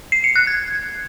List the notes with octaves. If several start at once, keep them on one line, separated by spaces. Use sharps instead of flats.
C7
C#7
F#6
G#6